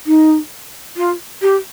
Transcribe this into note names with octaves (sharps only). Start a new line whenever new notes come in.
D#4
F4
G4